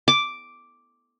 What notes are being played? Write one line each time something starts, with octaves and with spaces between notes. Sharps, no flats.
D6